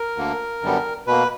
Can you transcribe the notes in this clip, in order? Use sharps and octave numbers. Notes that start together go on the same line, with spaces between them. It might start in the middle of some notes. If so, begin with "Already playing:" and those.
Already playing: A#4
D2 D3 A#3
F#2 D3 G3 B3
B2 A#3 B4